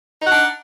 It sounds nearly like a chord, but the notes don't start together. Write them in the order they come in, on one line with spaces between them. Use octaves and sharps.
D#4 F#5 D4